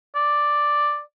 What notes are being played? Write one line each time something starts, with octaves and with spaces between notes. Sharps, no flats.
D5